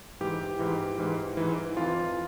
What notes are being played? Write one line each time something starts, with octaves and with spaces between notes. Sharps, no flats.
G#2 E3 G4
G#2 E3
G#2 E3
G#2 E3
F2 E3 F4